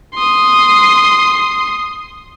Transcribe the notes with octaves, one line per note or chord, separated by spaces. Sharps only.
C6 D#6